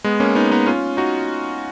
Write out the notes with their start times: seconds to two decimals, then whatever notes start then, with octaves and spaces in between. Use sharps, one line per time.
0.04 G#3 B3
0.20 A#3 C#4
0.35 B3 D#4
0.51 B3 D#4
0.66 C#4 F4
0.97 D#4 F#4